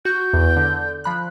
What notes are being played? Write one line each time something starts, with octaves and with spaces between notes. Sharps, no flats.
F#4 C#6 G6
E2
D3
F3 B5 F#6